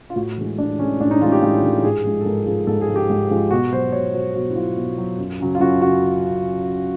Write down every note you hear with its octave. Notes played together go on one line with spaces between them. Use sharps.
F4
A2 F#4
E3 G#3
A2 D4
E3 G#3 C#4
A2 D4
D#4
E3 G#3 F4
G4
A2
E3 G#3
G#2 G#4
F3 G#3
A4
G#2 A#4
F3 G#3 G#4
G#2 A4
G#4
F3 G#3
G4
G#2
F3 G#3
B2 F#4
F#3 C5
B2 C#5
F#3 C5
B2 F#4
E4
F#3 F4
B2
F#3
F#2
C#3 F#3
F4
F#2 F#4
C#3 F#3 F#4